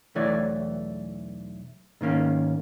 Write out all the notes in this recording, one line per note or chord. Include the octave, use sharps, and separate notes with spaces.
B1 E2 E3 A3 C#5 D5
G#2 D#3 A#3 C#4